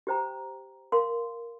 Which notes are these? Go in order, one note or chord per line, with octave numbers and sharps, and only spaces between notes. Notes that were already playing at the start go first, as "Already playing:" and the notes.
G4 C5 G5 A#5
A#4 F5 C6